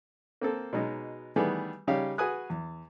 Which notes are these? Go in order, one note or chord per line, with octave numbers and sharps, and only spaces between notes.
A#3 C4 A4
B2 F#3 G#3 D#4
D#3 E3 G3 A3 B3 G#4
C#3 G3 D#4 G4 C#5 F5
F#4 G#4 B4 G#5 D#6 F#6
E2